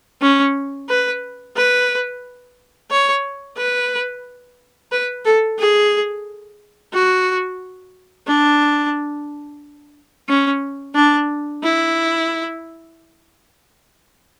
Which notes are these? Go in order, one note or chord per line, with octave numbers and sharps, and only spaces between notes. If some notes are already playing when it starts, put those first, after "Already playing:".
C#4
B4
B4
C#5
B4
B4
A4
G#4
F#4
D4
C#4
D4
E4